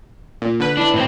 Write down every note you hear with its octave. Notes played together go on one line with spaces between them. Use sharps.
A#2
D3 B4
D4 E4
A2 C4